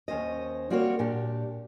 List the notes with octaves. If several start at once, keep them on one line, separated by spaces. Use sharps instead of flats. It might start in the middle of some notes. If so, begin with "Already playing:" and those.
D#2 C#4 C5 D#5
G3 A#3 C4 F#4 A#4 C#5
A#2 D4 G4